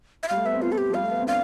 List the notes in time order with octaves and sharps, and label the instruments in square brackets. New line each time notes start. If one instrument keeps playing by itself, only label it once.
[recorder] E5
[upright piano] G3 [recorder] F5
[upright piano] A3
[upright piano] B3 [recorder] E5
[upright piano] C4
[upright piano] B3 [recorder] F4
[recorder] A4
G4
[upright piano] F3
[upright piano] G3 [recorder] F5
[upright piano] A3
B3
C4
[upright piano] D4 [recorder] F5